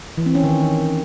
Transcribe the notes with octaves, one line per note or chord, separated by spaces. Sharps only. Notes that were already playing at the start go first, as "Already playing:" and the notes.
E3
C4
C#4
D#3